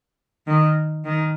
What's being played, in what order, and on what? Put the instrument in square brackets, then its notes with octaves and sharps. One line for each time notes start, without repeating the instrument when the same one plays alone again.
[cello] D#3
D#3